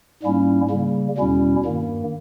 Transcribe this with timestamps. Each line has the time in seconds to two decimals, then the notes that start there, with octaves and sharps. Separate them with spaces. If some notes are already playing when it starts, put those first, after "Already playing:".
0.23 G#2 G3 A#3 C#4 E4
0.70 C#3 G3 A#3
1.18 E2 B2 G3 C#4 E4
1.65 G2 D#3 A#3